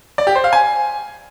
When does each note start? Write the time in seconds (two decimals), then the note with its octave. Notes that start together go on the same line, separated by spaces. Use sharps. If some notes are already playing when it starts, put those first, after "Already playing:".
0.18 D5
0.27 G4
0.35 C5
0.44 F5
0.53 G#5